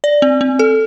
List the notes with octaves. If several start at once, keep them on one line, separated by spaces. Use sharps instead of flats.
D5
C4
C4
A4